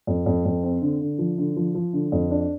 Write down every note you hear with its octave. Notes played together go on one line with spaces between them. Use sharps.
F2
F2
F2
C4
D3
D3
F3
D3
F3
F3
D3
F2
D4